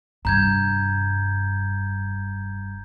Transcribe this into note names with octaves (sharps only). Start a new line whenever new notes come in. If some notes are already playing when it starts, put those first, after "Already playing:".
F1 G2 A#5 G6 G#6